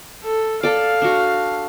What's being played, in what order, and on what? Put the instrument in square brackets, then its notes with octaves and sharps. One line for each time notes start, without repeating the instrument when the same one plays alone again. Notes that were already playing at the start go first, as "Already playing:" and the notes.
[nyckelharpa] A4
[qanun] A4 D5 [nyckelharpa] F5
[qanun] D4 F#4